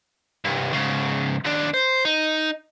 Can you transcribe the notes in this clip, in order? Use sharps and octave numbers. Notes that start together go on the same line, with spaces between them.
C2 G2
G#2 C#3
D#2 D4
C5
D#4